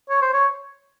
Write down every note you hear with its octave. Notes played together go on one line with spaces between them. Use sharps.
C#5
C5
C#5